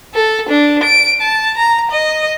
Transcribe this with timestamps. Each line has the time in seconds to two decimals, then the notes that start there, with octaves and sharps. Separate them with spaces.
0.14 A4
0.49 D4
0.83 D7
1.21 A5
1.57 A#5
1.91 D#5